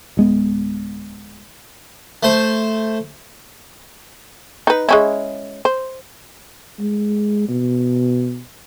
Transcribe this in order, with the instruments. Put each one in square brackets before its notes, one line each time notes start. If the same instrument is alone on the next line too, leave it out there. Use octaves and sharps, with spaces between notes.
[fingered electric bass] D1 G#3 B3
[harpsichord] A3 C5
[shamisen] D#4 B4
G#3 C#4 E4
C5
[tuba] G#3
B2